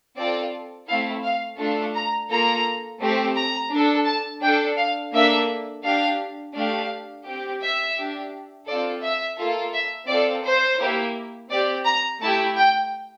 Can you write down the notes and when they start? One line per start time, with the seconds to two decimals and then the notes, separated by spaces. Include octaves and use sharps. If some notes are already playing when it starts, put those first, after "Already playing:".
0.17 C4 F4 A4 D5
0.88 A3 C4 E4 A4 F5
1.24 F5
1.58 A3 D4 F4 A4
1.95 A#5
2.29 A#3 F4 A4 A#5
3.01 A3 C4 G4
3.35 A#5
3.71 D4 A4
4.06 A5
4.42 D4 A4 G5
4.77 F5
5.13 A#3 D4 A4 E5
5.83 D4 G4 F5
6.55 A3 D4 G4 F5
7.26 C4 G4
7.61 E5
7.96 D4 G4
8.66 C4 F4 A4 D5
9.02 E5
9.37 A#3 F4 A4
9.74 E5
10.08 C4 F4 A4 D5
10.44 C5
10.79 A#3 E4 G4
11.50 C4 G4 D5
11.85 A#5
12.20 A3 E4 G4 A5
12.56 G5